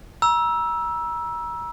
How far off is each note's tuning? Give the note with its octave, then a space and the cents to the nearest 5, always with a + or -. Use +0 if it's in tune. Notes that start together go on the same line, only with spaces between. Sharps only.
A#5 +35 E6 +0